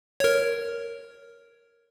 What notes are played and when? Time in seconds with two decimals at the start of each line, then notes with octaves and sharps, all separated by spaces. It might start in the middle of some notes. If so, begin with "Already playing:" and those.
0.20 A#4 C#5